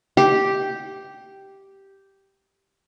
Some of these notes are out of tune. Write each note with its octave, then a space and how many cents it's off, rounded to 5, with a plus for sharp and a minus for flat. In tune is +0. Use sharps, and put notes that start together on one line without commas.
G4 -5